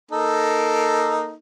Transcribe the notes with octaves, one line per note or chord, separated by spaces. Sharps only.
A#3 D#4 A4